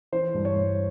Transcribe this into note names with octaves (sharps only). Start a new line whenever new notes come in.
E3 C5
G2
C#5
G2